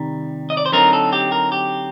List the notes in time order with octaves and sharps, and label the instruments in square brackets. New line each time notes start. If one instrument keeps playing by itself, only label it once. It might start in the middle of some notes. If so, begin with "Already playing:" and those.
Already playing: [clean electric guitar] C3 D#3 G3
D#5
D5
C5
D3 F#3 C4 D#4 A#4
A4
G4
A#4
G4